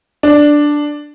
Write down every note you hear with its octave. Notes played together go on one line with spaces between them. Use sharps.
D4